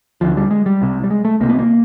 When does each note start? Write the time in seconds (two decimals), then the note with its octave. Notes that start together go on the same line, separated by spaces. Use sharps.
0.21 D2 D3 F3
0.37 G3
0.51 G#3
0.66 G3
0.81 C2 C3
1.04 G3
1.10 G#3
1.25 A3
1.40 C2 C3 A#3
1.50 B3
1.59 A#3